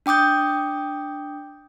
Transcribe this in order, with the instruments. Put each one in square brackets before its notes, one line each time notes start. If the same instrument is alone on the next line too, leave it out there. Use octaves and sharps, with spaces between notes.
[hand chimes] D4 G5 D6 D#6 G6